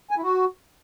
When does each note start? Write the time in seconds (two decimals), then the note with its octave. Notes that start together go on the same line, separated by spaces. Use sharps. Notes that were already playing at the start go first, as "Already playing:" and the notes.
0.11 G#5
0.17 E4
0.22 F#4